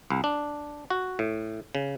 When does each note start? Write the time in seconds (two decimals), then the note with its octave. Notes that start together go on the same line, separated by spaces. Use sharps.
0.10 C2
0.24 D4
0.90 F#4
1.19 A2
1.75 C#3